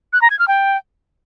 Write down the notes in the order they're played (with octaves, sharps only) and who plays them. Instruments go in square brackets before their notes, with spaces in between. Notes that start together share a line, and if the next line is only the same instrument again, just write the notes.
[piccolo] F#6
A#5
G#6
F6
G5